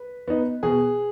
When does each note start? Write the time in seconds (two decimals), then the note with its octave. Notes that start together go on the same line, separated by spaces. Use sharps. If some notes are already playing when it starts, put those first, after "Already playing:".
Already playing: B4
0.28 B3 D#4
0.63 B2 G#4